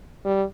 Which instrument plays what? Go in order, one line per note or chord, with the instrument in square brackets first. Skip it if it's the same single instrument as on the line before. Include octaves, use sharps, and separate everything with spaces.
[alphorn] G3